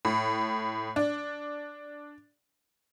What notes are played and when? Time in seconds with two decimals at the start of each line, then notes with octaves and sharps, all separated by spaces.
0.05 A2
0.96 D4